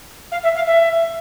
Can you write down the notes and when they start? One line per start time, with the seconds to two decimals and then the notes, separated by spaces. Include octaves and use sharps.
0.31 F5
0.43 E5
0.55 F5
0.66 E5